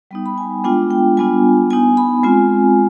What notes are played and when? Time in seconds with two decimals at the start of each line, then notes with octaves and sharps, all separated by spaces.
0.11 G3 B3 D#4 G5
0.26 B5
0.38 G#5
0.64 G#3 B3 D4 F4 G5
0.91 G5
1.17 G3 B3 D4 F4 G#5
1.70 B3 D#4 G#5
1.97 B5
2.23 G#3 C4 F4 G#5